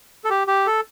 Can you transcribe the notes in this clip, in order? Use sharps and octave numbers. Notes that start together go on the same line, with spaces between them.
A4
G4
G4
A4